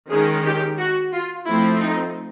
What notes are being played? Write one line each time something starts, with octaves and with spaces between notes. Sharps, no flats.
D#3 G#3 C#4 G#4
G4
F#4
F4
F3 A3 C4 E4
D#4